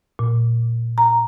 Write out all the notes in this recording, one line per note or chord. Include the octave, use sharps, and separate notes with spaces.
A#2
A#5